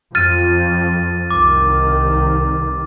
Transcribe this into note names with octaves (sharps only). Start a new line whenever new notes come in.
F2 F3 F6 A6 D#7
C2 D#3 D6